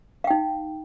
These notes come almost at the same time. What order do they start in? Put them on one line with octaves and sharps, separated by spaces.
F5 G5 D#4